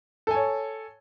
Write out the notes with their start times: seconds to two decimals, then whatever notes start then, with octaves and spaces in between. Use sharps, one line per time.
0.27 A4
0.31 G#5
0.34 C#5